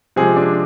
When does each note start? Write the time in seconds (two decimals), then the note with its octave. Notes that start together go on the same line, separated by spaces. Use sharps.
0.16 C3 F3 G#3 G#4
0.36 D4